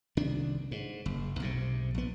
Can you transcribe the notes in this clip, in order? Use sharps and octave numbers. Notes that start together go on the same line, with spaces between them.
C2 D#3 D4
G#2
F#1
B1 G#2 C3
A#1 B3